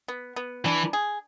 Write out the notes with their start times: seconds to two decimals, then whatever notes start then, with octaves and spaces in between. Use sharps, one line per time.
0.08 B3
0.36 B3
0.65 E3 D4
0.93 G#4